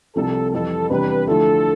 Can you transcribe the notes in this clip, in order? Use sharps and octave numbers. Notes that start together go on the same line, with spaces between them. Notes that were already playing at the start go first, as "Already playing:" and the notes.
C2 C3 F3 A4
F2 E3 G3 A4
E2 C3 G3 D4 G4 B4
D2 D3 F3 A3 E4 A4